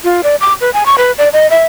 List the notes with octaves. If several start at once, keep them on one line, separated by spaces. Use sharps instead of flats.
F4
D5
D6
B4
G#5
C#6
B4
D5
D#5
E5